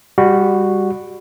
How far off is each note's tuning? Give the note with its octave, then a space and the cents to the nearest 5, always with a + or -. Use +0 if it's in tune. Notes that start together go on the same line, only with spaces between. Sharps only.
G3 +20 F#4 +0